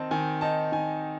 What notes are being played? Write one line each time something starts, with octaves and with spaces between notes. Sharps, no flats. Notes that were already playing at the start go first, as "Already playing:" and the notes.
Already playing: D#3 C4 D#4 A5
D#3 G#5
D#4 A5
D#3 G#5